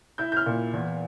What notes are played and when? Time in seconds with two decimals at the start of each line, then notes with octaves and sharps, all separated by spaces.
0.18 E4 G6
0.32 G6
0.37 F6
0.46 A#2
0.73 E2